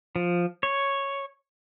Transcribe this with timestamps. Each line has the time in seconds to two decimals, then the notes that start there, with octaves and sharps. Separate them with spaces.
0.16 F3
0.63 C#5